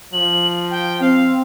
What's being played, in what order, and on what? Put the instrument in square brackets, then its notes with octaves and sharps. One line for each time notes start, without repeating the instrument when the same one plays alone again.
[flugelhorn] F3 [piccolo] F#7
[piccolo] G5
[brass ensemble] C4 [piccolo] F5